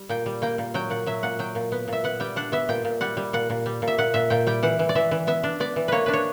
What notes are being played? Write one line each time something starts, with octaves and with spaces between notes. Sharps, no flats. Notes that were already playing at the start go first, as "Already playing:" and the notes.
Already playing: G3
A#2 G5
G3
A#3 G5
A#2
F#3 G5
A#2 F#5
F#3 E5
A#2 F#5
F#3 G5
A#2
B3
A#2 E5
B3 F#5
G3 G5
D4 F#5
B3 E5
A#2 G5
A#2
G3 F#5
G3
A#2 F#5
A#2
G3
A#2
E5
A#2 F#5
A#2 E5
A#2 G5
G3 G5
E3 F#5
E3
D5
E3 E5
E3
B3 E5
D4
B3 D5
E3
A#3 B4 C#5
D4 B4
C#5